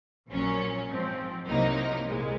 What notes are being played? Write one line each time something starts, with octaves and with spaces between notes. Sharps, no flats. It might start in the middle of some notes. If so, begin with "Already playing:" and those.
A#1 A#2 F#3 C#4
G#2 F3 C4
C2 C3 F#3 A#3 D#4
C2 A#2 G#3